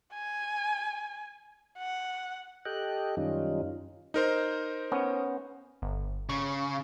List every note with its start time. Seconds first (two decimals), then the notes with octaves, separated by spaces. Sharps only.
0.14 G#5
1.78 F#5
2.65 G4 A4 D#5 G5 F#6
3.17 F#2 D#3 G3 C#4 D#4 F4
4.14 D#4 A#4 C5
4.92 B3 C#4
5.82 G1
6.29 C#3 C#6